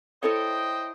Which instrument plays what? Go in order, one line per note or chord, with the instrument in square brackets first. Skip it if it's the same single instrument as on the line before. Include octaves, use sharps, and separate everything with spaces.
[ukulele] E4 A4 C#5 [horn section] C5 D#5 G5